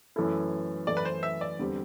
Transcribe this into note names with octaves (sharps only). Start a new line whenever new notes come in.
F#2 E3 A3 E4 A4
F#2 E3 A3 E4 A4 D5
B4
C5
E5
D5
E2 D3 G3 C4 G4